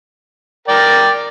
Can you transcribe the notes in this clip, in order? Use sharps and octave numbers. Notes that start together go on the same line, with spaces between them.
A#4 D5 G5